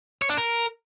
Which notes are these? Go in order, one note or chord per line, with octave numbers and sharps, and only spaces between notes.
C#5
D4
A#4